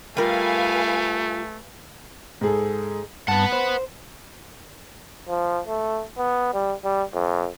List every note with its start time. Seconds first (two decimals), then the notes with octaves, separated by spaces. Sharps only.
0.17 G3 A3 F4 A#4 B4 F5 G#5
2.41 G#2 G#4 A4
3.28 G2 B4 F#5 A5
3.53 C5
5.29 F3
5.67 A3
6.18 B3
6.54 G3
6.84 G3
7.14 F2